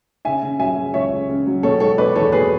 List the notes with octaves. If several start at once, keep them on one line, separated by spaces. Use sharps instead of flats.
C#3 E5 G#5
C#3
F#3 E5 G#5
F#3
C#2 C#5 E5
C#3
C#3
F#3
B2 A4 C#5
G#3 A4 C#5
B2 B4 D5
E2 A4 C#5
B2 G#4 B4